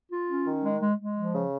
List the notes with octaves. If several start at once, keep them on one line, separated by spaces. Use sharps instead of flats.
F4
C#4
D#3
G#3
G#3
G#3
F3
C#3